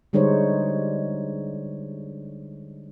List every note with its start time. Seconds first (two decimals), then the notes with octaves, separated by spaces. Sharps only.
0.13 D3 G3 G#3 D#4 C5 C#5